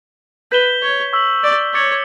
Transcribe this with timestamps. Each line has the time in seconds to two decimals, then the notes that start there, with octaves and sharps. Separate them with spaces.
0.51 B4 G6 B6 E7 G7
0.82 C#5
1.13 C#6 E6 B6 F#7
1.43 D5
1.74 C#5 D6 A6 C#7 F#7